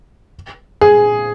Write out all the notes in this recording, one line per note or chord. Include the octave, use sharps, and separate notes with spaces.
G#4